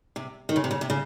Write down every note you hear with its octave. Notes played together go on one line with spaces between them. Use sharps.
C3
D#3
C#3
C3
C#3
C3
C#3